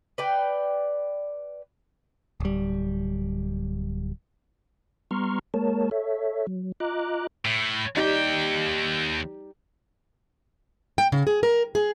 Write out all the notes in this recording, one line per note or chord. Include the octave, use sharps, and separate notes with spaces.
B4 D5 G5
D1 G3
G3 B3 A#5 C6 C#6 F6
G#3 A#3 A#4 C#5 A5
A4 C#5 E5
F#3
F4 D#5 A#5 D6 F#6
A2
D#2 G3 D#4 G4 G5
G5
C#3
G#4
A#4
G#4